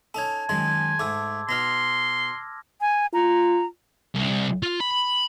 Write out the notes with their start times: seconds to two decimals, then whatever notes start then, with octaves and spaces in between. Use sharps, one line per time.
0.14 C#4 D#4 A4 A5 G#6
0.49 F#2 D#3 G#3 G#5 C6
0.99 G#2 A3 D6 E6 G#6
1.49 B2 D#4 C6 F6 A#6
2.81 G#5
3.14 F4 A#5
4.15 C2
4.63 F4
4.80 B5